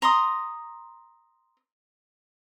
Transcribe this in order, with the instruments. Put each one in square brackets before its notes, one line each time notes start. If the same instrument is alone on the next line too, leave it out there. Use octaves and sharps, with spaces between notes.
[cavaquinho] A#5 C6 D#6